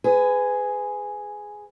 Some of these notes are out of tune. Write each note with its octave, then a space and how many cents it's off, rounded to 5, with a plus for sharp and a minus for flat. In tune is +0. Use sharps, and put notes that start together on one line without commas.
G#4 +0 B4 +30